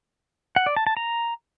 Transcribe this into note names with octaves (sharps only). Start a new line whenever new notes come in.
F#5
D5
A5
A5
A#5